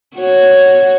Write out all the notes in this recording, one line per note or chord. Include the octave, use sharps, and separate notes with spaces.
F#4 C#5